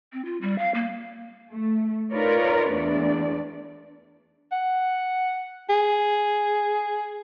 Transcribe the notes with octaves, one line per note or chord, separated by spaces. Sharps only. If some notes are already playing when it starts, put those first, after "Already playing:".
C4
F4
G3
F5
A#3
A3
D#4 F4 A#4 B4 C#5 D5
E2 A3 D4 D5
F#5
G#4